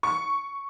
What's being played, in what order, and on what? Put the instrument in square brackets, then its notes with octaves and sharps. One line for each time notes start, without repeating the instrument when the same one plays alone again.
[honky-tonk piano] C#6